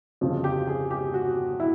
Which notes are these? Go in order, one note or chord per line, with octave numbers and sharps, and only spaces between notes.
G1 F2 C#3 F3
G4
G#4
G4
F#4
E4